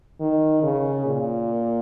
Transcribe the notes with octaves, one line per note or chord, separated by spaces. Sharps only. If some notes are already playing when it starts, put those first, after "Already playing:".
D#3
C#3
A#2